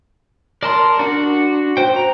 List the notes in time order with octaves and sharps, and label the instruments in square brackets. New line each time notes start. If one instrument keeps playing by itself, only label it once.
[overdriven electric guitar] A#4 [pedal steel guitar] D5 A5 C6
[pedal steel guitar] D4 [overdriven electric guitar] F#4
[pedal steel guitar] C5 G5
A#5